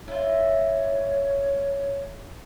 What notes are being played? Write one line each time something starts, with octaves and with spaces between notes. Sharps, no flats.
E4 F4 C#5